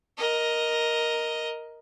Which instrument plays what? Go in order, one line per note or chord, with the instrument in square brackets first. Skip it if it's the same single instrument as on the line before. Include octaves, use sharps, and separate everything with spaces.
[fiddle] A#4 D#5